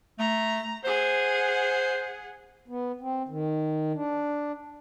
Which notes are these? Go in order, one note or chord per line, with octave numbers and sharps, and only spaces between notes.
A3 A#5
G#4 C5 F#5
B3
C4
D#3
D4